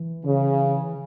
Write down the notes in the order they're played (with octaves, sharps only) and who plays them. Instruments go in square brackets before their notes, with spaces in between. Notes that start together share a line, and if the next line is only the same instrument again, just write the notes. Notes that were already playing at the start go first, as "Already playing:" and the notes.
Already playing: [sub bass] E3
[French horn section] C#3